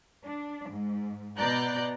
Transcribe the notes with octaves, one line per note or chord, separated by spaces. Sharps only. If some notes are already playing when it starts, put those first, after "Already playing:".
D4
G#2
B2 D5 A#5 F#6 G6